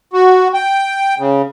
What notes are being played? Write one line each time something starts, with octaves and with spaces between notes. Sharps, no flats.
F#4
G5
C#3